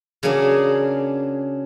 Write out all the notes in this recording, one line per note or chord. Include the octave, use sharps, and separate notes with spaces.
C#3 F#3 A#3 D4 G#4